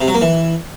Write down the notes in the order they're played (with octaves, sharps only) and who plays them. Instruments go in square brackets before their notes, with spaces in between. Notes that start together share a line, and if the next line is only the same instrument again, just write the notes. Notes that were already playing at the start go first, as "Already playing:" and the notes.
[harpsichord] C3
F#3
A#3
E3